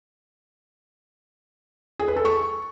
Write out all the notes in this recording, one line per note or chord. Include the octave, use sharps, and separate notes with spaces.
G#4
B4
A4
C#6